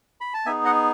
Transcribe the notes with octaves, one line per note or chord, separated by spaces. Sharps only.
B5
A5
B3 D#4 G#4 E5 G#5
D#5 F#5